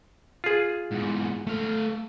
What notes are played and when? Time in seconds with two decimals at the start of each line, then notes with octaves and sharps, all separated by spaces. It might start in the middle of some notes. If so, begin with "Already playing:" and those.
0.44 F4 G#4
0.92 E2 G#2
1.47 A3 F5